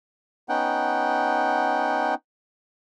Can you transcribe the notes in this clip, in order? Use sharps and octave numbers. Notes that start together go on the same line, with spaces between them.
B3 C#4 D#4 F#5 G5